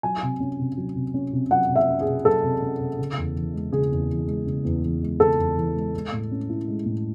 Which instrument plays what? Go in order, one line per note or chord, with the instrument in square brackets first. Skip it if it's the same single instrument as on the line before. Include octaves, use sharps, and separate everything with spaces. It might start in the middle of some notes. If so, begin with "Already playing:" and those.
[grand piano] F#3 G#5
C3
C#4
C3
F#3
C3
C#4
C3
F#3 F#5
C3
E5
C#4
G#4
C3
F#3 A4
C3
C#4
C3
C#3
E2
E3
G#3
C#3 G#4
E2
E3
G#3
C#3
E2
E3
G#3
C#3 A4
E2
E3
G#3
G#3
A2
C#4
E4
G#3
A2